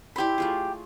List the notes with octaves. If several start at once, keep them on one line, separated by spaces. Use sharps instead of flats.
E4 G4 D5 B5 C6
A3 F4 G#4